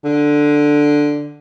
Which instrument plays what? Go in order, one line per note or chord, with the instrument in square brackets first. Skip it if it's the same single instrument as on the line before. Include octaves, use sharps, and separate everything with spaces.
[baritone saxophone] D3